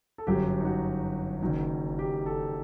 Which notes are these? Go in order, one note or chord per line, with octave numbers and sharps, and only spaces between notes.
A4
G1 F#2 F#3 G4
G4
D#4
F#4
F#1 F#2 D#3
G4
A4